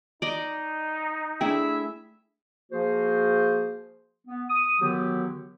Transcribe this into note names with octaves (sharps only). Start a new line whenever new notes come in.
D#4 D5 D#5
A3 D4 E4 G#4 E5 G5
F3 A#3 F#4 G#4 C5
B3
D#6
D3 D#3 F#3 B3 F#4 G4